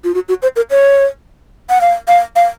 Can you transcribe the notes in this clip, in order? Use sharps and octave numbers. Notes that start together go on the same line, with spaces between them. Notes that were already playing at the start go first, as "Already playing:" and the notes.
F4
F#4
F#4
C5
A#4
C#5
F#5
F5
F5
F5